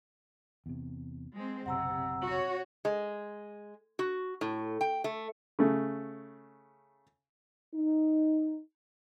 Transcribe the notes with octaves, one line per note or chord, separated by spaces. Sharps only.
E2 C3
G#3 C4
F#1 B1 C3 F#5 A#5 E6
F#4 C#5
G#3
F#4
A2
G5
A3
C#3 A3
D#4